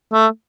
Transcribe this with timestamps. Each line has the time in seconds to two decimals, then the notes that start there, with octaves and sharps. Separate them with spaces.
0.13 A3